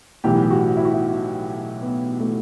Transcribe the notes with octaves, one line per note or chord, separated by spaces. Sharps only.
B1 A2 E3 G4
G4
F#4
E4
F#4
E4
B3
A3